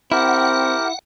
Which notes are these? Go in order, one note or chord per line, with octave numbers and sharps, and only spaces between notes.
C4 E4 G4 A#4 F#5